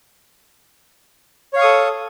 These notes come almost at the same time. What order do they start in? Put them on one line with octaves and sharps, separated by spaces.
C#5 F5 C#6 D#6 A4